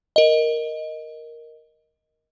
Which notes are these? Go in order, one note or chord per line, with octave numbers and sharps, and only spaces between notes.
A#4 D#5